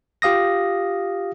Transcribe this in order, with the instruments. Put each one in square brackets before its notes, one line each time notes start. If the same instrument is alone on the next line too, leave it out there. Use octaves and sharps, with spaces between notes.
[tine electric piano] F4 G4 F5 D#6 A#6